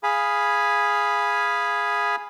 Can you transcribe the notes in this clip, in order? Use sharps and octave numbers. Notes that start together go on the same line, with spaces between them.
G#4 F5 G#5 B5